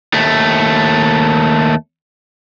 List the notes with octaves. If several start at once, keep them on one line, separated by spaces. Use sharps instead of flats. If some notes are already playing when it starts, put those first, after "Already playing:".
D#2 A3